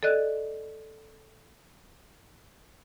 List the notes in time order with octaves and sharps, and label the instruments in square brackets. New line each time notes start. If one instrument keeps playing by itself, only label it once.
[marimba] A4 D5 D#5 F#6